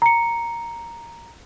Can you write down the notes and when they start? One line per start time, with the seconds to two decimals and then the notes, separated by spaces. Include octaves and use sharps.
0.02 A#5 C#7